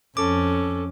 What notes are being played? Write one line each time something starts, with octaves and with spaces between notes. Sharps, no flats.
F2 C#4 A4 D6